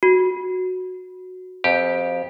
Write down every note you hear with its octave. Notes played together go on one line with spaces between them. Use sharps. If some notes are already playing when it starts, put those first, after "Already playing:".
F#4
F2 G4